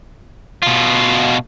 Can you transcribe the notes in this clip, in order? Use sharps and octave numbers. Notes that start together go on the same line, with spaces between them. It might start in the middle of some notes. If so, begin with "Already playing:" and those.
B2 F4